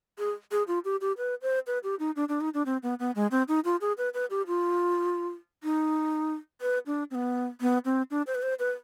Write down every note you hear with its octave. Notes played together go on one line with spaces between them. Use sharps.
G#4
G#4
F4
G4
G4
B4
C5
B4
G4
D#4
D4
D4
D#4
D4
C4
B3
B3
G#3
C4
D#4
F4
G#4
B4
B4
G4
F4
D#4
B4
D4
C4
B3
B3
C4
D4
C5
B4
C5
B4